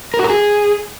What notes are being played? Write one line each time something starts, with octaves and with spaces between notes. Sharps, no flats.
A#4
F#4
A#4
G#4